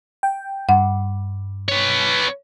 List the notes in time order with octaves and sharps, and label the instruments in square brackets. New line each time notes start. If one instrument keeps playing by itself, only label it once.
[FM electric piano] G5
[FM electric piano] G2 [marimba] F#5
[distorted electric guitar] B3 C#5